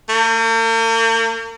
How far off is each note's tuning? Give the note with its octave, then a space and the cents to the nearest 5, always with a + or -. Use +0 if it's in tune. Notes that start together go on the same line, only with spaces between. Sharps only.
A#3 -45